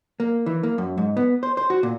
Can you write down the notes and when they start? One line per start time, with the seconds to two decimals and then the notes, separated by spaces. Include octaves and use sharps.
0.20 A#3
0.46 E3
0.63 A#3
0.78 F#2
0.98 G#2
1.17 B3
1.43 C5
1.57 C5
1.70 F#4
1.83 A#2